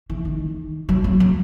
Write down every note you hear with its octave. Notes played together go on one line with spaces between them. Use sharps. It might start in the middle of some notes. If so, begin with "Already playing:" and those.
E3
D#3
F#3
F#3
F#3